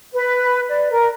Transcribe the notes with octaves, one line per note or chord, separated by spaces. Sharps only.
B4
D5
A#4